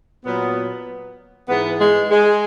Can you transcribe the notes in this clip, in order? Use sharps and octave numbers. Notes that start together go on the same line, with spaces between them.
A#2 F#3 B3
G#2 E3 B3
G#3
G#3